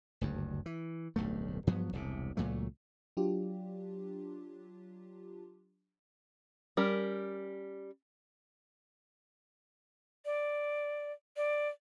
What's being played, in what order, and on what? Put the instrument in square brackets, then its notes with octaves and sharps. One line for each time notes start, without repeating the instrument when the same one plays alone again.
[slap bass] F#1 D2 G2
E3
D1 B1 G2 A3
G2 F3 F#3 B3
E1 C2 C3
C#2 A#2 F#3 A3
[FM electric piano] F#3 D4 F4 G4
[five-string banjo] G3 C#4 A#4
[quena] D5
D5